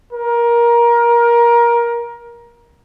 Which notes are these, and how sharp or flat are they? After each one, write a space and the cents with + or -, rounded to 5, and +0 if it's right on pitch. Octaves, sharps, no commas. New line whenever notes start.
A#4 +20